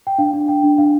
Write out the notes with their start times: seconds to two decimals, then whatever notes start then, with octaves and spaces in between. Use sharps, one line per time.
0.07 G5
0.18 D4 F5
0.33 D4
0.48 D4 G5
0.63 D4
0.78 D4 F5